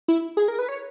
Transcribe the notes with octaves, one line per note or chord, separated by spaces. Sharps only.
E4
G#4
A#4
B4
C#5